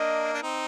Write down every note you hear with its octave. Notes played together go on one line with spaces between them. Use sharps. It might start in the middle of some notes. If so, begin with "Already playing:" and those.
Already playing: A#3 D4 D#5
D4
C4 D#4